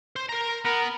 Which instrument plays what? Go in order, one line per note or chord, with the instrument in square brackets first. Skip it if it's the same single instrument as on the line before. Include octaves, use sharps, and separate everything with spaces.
[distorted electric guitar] C5
A#4 A#5
[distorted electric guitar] B3 [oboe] A#4